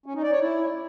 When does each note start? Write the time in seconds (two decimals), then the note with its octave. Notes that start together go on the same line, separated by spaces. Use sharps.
0.06 C#4
0.14 D#4
0.23 D5
0.32 C#5
0.41 E4